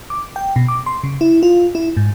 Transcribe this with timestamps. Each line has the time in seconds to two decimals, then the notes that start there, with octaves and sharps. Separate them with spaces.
0.10 D6
0.36 G5
0.56 B2
0.68 D6
0.86 C6
1.04 C#3
1.21 E4
1.43 F4
1.75 E4
1.97 G#2